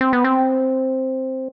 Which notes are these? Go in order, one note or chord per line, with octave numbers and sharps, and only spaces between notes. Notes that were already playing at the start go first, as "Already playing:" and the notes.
C4
B3
C4